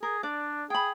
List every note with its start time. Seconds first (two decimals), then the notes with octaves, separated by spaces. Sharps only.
0.03 G#4 A#4
0.23 D4 D5
0.70 G#4 G5 B5